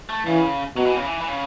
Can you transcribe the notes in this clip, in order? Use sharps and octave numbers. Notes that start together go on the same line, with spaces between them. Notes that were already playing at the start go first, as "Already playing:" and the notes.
A3
C#3 E3
B2 F#3
E3
C#3
E3
E3
C#3